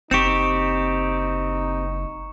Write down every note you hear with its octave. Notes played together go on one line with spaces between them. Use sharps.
F#1 C4 D#4 G4 C#6 C#7 E7